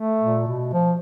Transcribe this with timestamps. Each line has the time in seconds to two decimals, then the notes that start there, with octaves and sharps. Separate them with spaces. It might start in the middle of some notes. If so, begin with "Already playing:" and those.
Already playing: A3
0.21 A#2
0.47 B2
0.73 F3